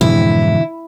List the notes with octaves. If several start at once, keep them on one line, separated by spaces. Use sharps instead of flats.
F2 G#2 B2 D3 E3 C4 E4